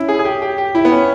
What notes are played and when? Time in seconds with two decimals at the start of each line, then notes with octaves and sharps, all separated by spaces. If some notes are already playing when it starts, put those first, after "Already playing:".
Already playing: C#4 E4
0.09 G#4
0.19 G#4
0.25 G4
0.42 G4
0.58 G4
0.75 E4
0.85 B3
0.91 C#4